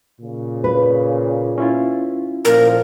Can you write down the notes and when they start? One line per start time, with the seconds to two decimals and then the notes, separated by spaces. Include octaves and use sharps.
0.20 A#2 C#3
0.64 B4
1.58 C#4 E4 F4
2.45 A#2 F3 A#4